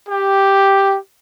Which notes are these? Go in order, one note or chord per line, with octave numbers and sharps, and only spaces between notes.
G4